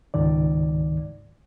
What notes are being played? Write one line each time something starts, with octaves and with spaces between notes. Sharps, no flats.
C#2 G#2 D#3 D5